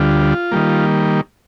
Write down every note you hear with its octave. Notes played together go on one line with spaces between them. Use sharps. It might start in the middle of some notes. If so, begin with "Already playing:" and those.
Already playing: D2 D3 G3 F4
D#3 G3 A#3